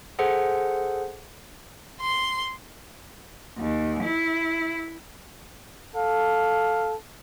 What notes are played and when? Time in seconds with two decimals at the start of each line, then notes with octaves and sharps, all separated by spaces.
0.19 G#4 A4 C5 F#5
2.02 C6
3.58 D#2
4.03 E4
5.94 A4 F5